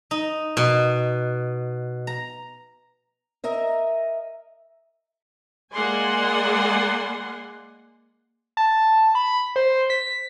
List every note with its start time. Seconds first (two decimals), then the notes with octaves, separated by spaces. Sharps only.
0.11 D#4
0.57 B2
2.07 A#5
3.44 A#4 D#5 E5
5.73 G#3 A#3 D5 F#5 G#5 C6
8.57 A5
9.15 B5
9.56 C5
9.90 B6